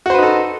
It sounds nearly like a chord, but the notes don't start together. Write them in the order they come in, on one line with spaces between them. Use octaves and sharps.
F#4 C5 B4 D#4 A4